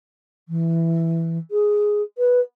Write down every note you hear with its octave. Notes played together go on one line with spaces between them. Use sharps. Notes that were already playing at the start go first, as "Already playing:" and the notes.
E3
G#4
B4